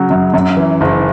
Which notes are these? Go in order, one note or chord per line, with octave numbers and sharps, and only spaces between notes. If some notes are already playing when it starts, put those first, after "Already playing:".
Already playing: C#3 F#3
F#2
F#2
E3
F#1